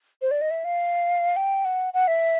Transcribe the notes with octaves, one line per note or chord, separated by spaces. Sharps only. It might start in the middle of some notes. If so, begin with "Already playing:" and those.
C5
D5
D#5
E5
F5
G5
F#5
F#5
E5